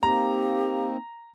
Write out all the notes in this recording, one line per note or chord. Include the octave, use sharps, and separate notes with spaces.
A#3 C4 D#4 G4 A#5